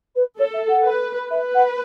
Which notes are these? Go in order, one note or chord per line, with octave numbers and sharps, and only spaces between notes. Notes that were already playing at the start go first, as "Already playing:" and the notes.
B4
A4 C#5
E5
F#5
B4
B4 E5
F#5